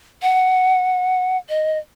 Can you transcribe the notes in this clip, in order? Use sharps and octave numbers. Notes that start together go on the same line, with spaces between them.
F#5
D#5